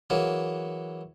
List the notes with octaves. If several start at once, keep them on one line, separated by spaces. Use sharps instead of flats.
E3 F#3 A#3 G#4